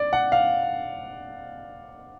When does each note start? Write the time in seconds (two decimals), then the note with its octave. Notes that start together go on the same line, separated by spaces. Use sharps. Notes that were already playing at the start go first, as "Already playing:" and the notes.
Already playing: D5
0.13 F#5
0.32 F5